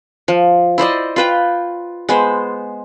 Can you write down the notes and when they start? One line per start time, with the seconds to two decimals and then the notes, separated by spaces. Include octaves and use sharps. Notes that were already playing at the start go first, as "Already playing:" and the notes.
0.28 F3
0.78 E4 C5 D5 D#5
1.16 F4 B4 G5
2.09 G#3 B3 C5